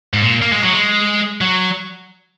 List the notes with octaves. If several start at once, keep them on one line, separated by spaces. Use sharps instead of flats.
G#2
A#2
A#3
G#3
F#3
G#3
F#3